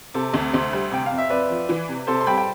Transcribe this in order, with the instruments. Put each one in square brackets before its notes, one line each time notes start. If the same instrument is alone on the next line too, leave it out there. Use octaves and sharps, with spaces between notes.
[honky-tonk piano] C3 [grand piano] A4 C5
[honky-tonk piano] D2
[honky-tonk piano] D2 [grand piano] C5 E5
[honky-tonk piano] G3
[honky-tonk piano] C3 [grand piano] G5
[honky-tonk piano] F2 [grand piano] F5
[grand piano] E5
[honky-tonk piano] F2 [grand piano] B4 D5
[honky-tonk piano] F3
E3
C3
[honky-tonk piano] C3 [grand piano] A4 C5
[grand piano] C6
[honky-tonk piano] G3 [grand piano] G5 B5
[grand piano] G5